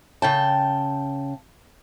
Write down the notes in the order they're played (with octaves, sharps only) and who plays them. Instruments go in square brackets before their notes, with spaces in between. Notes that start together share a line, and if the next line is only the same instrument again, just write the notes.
[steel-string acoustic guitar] C#3 G5 A5